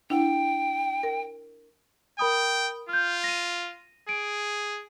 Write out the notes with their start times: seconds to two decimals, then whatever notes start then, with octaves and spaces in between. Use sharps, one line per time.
0.10 D4 E4 F#5 G5
1.03 A#4
2.19 A#4 G5 B5 D#6
2.89 F4 F6 G6
3.24 A#6 D#7
4.09 G#4 D7